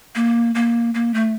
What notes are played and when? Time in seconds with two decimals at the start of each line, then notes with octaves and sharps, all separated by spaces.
0.15 A#3
0.55 A#3
0.94 A#3
1.14 A3